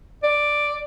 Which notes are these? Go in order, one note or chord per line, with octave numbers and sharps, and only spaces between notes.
D5